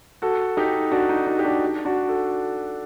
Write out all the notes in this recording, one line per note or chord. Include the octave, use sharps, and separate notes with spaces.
F#4 A4
D#4 G4
D4 F#4
D#4
D#4
G4
D4 F#4
D4 F#4
F#4 A4